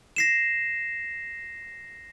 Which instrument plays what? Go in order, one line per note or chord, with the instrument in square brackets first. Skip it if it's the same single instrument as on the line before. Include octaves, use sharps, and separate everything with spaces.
[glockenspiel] A#6 C7 E7